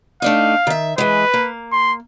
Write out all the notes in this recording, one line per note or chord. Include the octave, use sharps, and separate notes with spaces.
A3 D4 D#4 F5
D#3 E5
E3 G#3 B4
A#3
C6